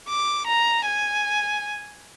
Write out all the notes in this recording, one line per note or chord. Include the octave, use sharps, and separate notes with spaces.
D6
A#5
G#5